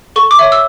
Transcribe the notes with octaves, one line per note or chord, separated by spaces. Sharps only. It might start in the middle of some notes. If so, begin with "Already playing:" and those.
A4 C#6
D6
C#5 E5
E6